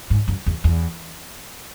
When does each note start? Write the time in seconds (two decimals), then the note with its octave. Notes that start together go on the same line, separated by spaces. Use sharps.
0.10 G#2
0.28 F#2
0.46 E2
0.64 E2